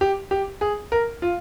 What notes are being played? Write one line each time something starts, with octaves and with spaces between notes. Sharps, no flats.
G4
G4
G#4
A#4
F4